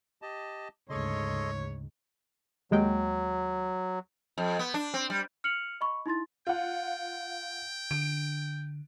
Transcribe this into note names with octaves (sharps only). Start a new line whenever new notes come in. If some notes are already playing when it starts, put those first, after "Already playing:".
G4 D#5 A5
D2 G#2 C#3 A4 C#5 D#5 C6
D#2 F#3 G#3 G5
F2
B3
D4
C4
G3
F6 C#7 F7 F#7
D#5 B5 C#6
D#4 E4 C6 A6
F4 F#5 G5
D3 D7